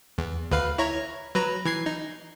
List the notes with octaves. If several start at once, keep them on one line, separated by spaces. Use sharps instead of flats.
E2
D2 B4 F5
E4 C#5 A#5
F#3 B4 A#5
E3 G#6 C7
D#4